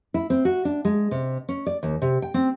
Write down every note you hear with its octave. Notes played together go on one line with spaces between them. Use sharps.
E4
C4
F#4
D4
G#3
C3
C#4
D5
D#2
C3
G5
C4